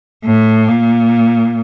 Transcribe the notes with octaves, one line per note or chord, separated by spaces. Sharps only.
A2
A#2